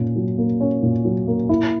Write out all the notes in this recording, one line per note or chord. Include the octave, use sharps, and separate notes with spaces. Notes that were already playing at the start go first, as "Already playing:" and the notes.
Already playing: A#2 C#4
F#3
A#3
C#4
A#2
F#3
A#3
E4